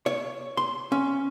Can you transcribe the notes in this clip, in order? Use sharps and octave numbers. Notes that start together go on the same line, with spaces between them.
C#5
C6
C#4